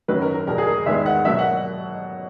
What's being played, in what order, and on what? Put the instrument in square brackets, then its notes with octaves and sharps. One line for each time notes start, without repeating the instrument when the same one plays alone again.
[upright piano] F#2 D#3 F#3 B4
A#4
A#4
E2 B2 A#3 A#4
G#4
A#4
E2 D#3 G#3 B3 E5
F#5
B2 F#3 A#3 E5
F#5